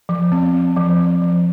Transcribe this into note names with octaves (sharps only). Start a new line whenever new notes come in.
F3
C4
C4
F3
C4
F3